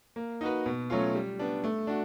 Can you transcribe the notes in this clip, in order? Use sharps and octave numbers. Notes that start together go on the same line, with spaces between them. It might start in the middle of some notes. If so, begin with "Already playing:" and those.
A#3
D#4 F#4 B4
B2
F#3 A3 C#4 F4
G3
B3 D4
A3
D4 F#4